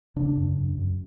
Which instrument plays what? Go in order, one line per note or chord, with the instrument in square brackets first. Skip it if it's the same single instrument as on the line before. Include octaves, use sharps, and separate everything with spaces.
[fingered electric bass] C#3 D4
F#2
F#2
F#2